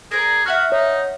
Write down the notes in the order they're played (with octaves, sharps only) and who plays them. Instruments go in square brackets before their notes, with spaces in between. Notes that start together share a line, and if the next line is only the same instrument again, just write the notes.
[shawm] G#4 [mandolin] A#4 B4 D5
[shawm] F#4 [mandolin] E5 F#5 F6
[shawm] D#4 [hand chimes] C#5